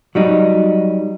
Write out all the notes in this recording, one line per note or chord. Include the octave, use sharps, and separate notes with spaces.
F#3 G3 D#4